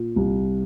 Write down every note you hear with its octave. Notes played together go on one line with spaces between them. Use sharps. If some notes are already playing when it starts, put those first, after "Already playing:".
Already playing: A#2
C2